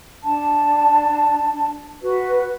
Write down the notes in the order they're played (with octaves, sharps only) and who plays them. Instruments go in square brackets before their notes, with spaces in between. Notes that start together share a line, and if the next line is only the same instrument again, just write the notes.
[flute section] D4 A5
F#4 B4